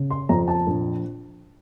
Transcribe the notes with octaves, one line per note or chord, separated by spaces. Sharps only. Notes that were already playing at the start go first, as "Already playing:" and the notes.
Already playing: C#3
C6
F2 A#5
A5
A#1